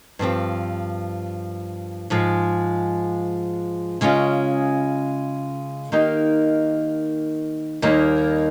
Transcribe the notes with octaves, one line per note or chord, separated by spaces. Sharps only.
G2 F3 C4 G4
G#2 F3 G#3
C#3 G#3 C#4 F4
D#3 A#3 D#4 G4
D#2 D#3 G3 A#3